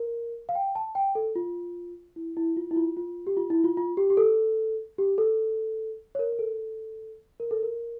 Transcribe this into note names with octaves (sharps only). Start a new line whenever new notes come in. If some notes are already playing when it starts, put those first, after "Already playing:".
Already playing: A#4
F5
G5
A5
G5
A4
F4
E4
E4
F4
E4
F4
F4
G4
F4
E4
F4
F4
G4
G4
A4
G4
A4
C#5
A#4
A#4
A4
A#4
A4
A#4